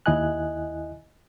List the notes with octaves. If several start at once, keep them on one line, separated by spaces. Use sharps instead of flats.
D#2 E4 D#5 G#5 F#6